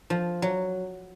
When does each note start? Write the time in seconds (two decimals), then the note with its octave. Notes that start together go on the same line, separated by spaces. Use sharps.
0.10 F3
0.42 F#3